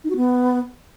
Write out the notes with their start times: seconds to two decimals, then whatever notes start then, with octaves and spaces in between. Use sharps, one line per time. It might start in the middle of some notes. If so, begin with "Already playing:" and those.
0.04 D#4
0.10 F#4
0.16 B3